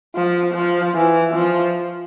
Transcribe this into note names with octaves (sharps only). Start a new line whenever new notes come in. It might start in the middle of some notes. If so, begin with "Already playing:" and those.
F3
F3
E3
F3